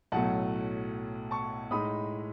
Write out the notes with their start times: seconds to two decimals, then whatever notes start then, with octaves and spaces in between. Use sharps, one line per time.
0.12 B1 A2 F#3 A3 F#5 A5
1.31 A5 C#6
1.71 A2 G#3 D#4 B5 D#6